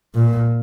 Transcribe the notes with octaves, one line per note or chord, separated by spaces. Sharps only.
A#2